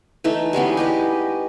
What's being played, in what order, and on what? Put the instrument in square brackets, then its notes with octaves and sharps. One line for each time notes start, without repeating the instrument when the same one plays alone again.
[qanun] E3 A3 D#4
G3 G#3 B3 C#4
G4 B4 D#5